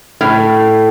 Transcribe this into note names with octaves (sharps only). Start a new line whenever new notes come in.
A2